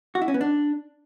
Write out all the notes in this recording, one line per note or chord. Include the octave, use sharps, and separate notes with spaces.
F#4
E4
C#4
B3
D4